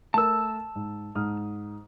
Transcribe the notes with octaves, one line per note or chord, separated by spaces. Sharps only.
A3 A#4 A5 E6
G#2
G#2 D#6 F6